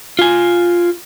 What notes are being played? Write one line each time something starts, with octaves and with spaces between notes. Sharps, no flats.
F4 G#5